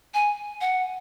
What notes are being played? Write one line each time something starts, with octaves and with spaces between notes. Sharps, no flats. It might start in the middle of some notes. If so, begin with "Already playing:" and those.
G#5
F#5